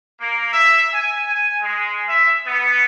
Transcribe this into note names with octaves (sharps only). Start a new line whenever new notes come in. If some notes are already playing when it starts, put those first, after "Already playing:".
A#3
E5
G#5
G#5
G#3
E5
B3